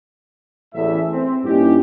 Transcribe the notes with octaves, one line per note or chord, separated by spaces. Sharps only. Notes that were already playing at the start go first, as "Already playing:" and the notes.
A1 E2 A2 E5
C4
G2 A#3 C#4 D#4 E4 G4